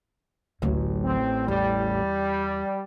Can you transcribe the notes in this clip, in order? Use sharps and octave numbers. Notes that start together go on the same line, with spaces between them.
A1 D2 F#3
C4
E2 G3